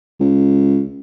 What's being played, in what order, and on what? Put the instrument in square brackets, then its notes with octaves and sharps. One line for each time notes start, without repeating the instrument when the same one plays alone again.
[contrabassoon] C#2